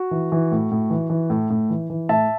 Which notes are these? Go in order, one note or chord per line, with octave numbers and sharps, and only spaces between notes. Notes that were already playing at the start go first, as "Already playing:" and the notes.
Already playing: F#4
E3
E3
A2
A2
E3
E3
A2
A2
E3
E3
A2 E5 A5